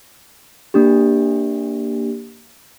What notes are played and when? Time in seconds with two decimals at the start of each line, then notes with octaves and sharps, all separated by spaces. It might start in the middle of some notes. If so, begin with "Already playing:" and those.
0.74 A#3 D4 G4